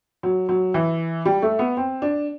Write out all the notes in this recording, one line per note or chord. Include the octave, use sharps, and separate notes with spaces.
F#3
F#3
E3
G3
A3
B3
C4
D4